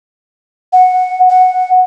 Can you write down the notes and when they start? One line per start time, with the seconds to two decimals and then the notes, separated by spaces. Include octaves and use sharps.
0.73 F#5
1.29 F#5